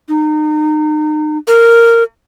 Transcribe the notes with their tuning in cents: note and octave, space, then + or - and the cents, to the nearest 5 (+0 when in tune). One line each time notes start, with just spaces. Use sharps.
D#4 -30
A#4 -10